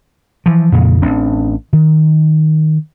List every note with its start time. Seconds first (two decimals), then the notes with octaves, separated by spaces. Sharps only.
0.46 E3 F3
0.72 F2 A#2 C#3
1.02 A1 C4 D4
1.73 D#3